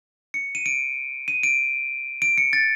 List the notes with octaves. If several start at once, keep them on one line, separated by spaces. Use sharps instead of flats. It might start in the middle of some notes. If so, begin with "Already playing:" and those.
C#7
D#7
D7
D#7
D7
D7
C#7
A6